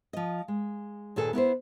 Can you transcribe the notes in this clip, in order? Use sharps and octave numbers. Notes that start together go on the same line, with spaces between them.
F3 D#5
G#3
D#2 A#2 G#4 A4 B4
B3 E4 B4 C5